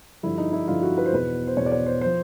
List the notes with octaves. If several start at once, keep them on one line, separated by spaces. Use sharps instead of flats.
G2 D3 F3 E4
D#4
E4
G2 D3 F3 F4
F#4
B4
C5
E2 B2 B4
C5
E2 B2 C#5
D5
C#5
C5
F3 C5